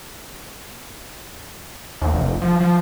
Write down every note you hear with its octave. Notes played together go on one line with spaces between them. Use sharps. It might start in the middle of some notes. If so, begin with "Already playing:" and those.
D#2
F1
F3
F3